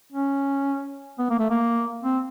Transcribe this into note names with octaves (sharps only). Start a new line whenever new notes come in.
C#4
B3
A#3
A3
A#3
C4